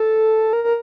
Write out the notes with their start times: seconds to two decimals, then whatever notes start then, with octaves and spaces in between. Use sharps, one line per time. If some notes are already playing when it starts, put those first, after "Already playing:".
Already playing: A4
0.53 A#4
0.64 A#4